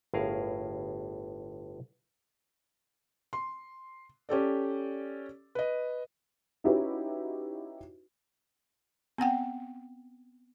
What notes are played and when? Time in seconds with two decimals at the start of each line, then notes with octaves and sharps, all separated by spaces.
0.14 G1 A2 G#4 A#4 F5
3.33 C6
4.29 C#4 G4 A4 D5
5.55 B4 D#5
6.64 C#4 D#4 E4 F#4 G4 B4
9.18 B3 C4 F#5 G5